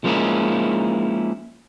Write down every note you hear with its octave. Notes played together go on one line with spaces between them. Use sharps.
F3 G#3 A#3 C#4 D#4 E4